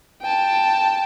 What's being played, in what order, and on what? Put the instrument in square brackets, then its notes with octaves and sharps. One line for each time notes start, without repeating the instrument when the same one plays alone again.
[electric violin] G5 A5